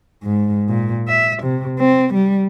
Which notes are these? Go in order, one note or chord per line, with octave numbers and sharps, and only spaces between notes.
G#2
A#2
E5
C3
C4
G3